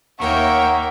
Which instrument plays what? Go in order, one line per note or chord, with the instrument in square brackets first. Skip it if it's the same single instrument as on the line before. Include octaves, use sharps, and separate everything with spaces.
[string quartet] D#2 C#5 G5 [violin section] A#3 A#4 E5 [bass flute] F#5 [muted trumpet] C#6